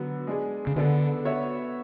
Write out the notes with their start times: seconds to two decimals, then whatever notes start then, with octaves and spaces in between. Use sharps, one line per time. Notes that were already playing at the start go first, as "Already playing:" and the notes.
Already playing: D3 F#3 B3
0.27 G#3 D4 G#4
0.67 C#3
0.76 D3 B3 D4 A4
1.25 B3 F#4 C#5 E5